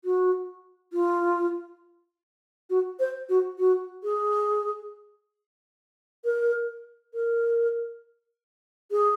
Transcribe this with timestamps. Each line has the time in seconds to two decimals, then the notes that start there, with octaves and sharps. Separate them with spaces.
0.05 F#4
0.93 F4
2.70 F#4
3.00 C5
3.29 F#4
3.59 F#4
4.04 G#4
6.25 A#4
7.14 A#4
8.92 G#4